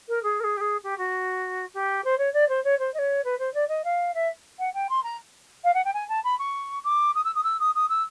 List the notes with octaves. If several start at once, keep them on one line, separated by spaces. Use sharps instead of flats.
A#4
G#4
A#4
G#4
G4
G#4
G4
F#4
G4
C5
C#5
D5
C5
C#5
C5
D#5
C#5
B4
C5
D5
D#5
F5
E5
F#5
G5
C6
A#5
F5
F#5
G5
G#5
A5
B5
C#6
D6
D#6
E6
D#6
E6
D#6
D#6
E6